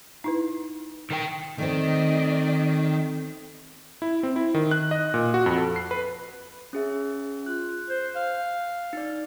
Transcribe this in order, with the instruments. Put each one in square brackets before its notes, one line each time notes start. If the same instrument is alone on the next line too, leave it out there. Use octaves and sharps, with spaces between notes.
[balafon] D#4 E4 B4
[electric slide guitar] D#3 A#4 G5
[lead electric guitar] D#3 [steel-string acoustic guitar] A3 C4 [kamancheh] D5 D#5
[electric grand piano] E4
C4
E4
D#3
F#6
D#5
A#2
F#4
F2
A4
C7
B4
[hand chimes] C#4 G#4 E5
[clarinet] F4 [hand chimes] F#6
[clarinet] C5
F5
[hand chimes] D#4 D5